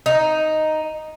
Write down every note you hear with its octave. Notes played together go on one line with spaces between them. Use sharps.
D#4